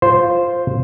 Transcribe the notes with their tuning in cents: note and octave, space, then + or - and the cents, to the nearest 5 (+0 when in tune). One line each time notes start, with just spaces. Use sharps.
F4 +0 C5 +0